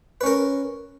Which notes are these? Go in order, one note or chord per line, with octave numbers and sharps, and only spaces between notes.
C#4 A#4 B4